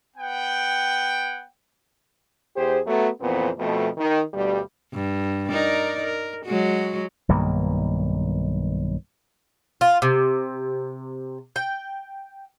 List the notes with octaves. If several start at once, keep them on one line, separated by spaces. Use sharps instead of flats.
B3 F#5 G5
E2 G4 G#4 C5
F#3 A3 B3
F2 A#2 E3 B3 C4
F2 B2 A3
D#3
D2 G2 B2 G3
G2
D#4 A#4 D5
A#4
F#3 G#3 F#4
B1 G2 D#3 A#3
F4
C3
G5